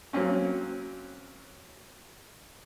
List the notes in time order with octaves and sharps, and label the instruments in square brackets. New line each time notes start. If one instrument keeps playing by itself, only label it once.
[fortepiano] F#3 A#3 C4 C#4